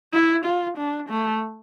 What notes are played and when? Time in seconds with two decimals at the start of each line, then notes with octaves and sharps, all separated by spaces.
0.13 E4
0.45 F4
0.77 D4
1.09 A3